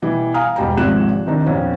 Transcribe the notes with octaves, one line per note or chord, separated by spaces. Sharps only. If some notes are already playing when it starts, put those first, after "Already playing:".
B2 E3 G3 G4
F5 G#5 A#5 D#6 F6
E1 B2 G3 G5 A#5
G#1 C3 F3 G#3 F#6 E7
C3 D#3 D4 D#4
A#1 E2 C4 C#4